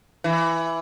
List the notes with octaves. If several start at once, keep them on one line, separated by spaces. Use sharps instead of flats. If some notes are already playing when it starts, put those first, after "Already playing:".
E3